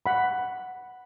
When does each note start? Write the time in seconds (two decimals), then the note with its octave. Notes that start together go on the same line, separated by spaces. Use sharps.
0.06 F#5 B5